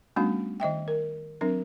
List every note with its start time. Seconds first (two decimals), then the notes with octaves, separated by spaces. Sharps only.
0.16 G3 A3 B3 C#4 D4 F#4
0.60 D#3 D#5 E5 G5
0.88 A#4
1.41 F#3 C4 D4 A#4